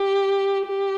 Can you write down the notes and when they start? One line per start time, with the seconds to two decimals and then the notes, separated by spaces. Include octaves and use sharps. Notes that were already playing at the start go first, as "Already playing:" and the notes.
Already playing: G4
0.66 G4